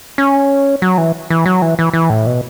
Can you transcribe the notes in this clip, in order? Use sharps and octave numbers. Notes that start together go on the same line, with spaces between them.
C#4
F#3
E3
E3
F#3
E3
E3
E3
A2
B2